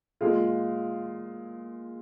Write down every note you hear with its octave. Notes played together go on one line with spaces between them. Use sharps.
A#2 G#3 F4